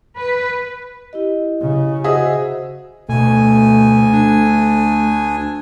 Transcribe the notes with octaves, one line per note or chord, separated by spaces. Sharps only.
B4
E4 G4 D#5
C#3
F#4 G#4 C5 D#5 E5 F#5
D2 B2 A3 G#5
D4